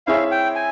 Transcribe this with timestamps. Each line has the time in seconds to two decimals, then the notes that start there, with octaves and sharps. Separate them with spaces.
0.07 C4 E4 G#4 C#5 E5 F5
0.31 G5
0.55 G#5